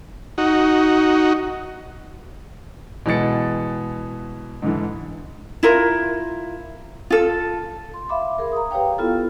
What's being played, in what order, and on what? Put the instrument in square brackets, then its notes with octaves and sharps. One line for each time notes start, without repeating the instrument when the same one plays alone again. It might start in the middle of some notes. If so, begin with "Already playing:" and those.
[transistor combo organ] D#4 F#4
[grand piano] B2 E3 G#3 A6 C#7
G#2 D3 E3
[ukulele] E4 F4 A#4
F4 A4
[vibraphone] C6
E5 F5 B5 D6
G#4 A#4
A#5 D#6
G4 B4 C#5 F5 G5
B3 E4 F4 G4 A4